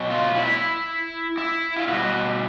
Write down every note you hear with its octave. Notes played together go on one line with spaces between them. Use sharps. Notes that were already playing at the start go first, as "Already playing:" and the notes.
Already playing: B2 F#3
F4
E4
E4
F4
B2 G3 F#4